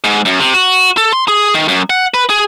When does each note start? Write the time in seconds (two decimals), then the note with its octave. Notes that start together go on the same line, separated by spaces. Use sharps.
0.04 G#2
0.25 F#2
0.40 C3
0.54 F#4
0.97 A4
1.12 C6
1.28 G#4
1.54 D#3
1.68 F#2
1.90 F#5
2.14 B4
2.30 G#4